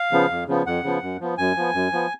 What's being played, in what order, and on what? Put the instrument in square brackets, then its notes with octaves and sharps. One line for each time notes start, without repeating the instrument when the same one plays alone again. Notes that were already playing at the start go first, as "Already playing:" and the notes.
Already playing: [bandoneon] F5
C#3 F3 B3
F2
C#3 F3 B3
F2 F#5
C#3 F3 B3
F#2
F3 B3
F#2 G#5
F3 B3
F#2
F3 B3